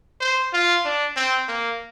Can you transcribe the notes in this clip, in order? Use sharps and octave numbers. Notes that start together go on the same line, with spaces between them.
C5
F4
D4
C4
A#3